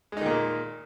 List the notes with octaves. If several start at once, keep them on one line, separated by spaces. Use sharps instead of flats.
A#2 D#3 G#3 A#3 D#4